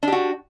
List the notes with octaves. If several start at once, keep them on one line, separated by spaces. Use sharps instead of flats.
D4 F#4 G4